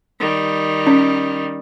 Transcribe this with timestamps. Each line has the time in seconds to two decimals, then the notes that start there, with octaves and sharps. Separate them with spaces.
0.19 D#3 G3
0.87 C#4